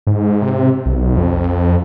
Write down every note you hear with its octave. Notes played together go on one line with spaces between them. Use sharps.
G#2
C3
B1
F2